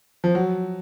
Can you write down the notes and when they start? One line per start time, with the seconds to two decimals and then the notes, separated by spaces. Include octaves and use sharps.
0.24 F3
0.35 F#3